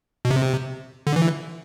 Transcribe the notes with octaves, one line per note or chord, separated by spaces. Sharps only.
B2
C3
D3
E3